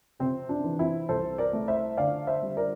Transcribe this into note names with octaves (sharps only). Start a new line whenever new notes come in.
C3 C4
D4
E3
C4 E4
C2 A4 C5
A#4 D5
A3
C5 E5
D3 D5 F5
C5 E5
G3
A#4 D5